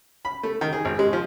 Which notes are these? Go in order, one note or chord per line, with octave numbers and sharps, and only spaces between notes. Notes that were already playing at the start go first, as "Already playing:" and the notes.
B5
A3
D#3
G#4
G#1
G#3
F3